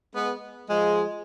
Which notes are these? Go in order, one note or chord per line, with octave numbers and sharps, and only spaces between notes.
G#3 B3
F3 G#3